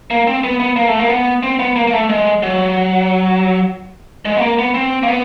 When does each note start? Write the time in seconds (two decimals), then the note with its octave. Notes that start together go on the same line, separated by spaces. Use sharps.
0.10 A#3
0.27 C4
0.44 B3
0.60 B3
0.76 A#3
0.88 A3
0.99 A#3
1.09 B3
1.43 C4
1.59 B3
1.76 A#3
1.87 A#3
1.93 A3
2.09 G#3
2.43 F#3
4.25 G#3
4.37 B3
4.41 A#3
4.59 B3
4.74 C4
5.03 A#3
5.08 B3